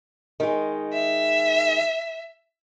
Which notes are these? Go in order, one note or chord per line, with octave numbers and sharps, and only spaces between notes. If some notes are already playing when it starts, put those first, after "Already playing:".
D#3 G#3
E5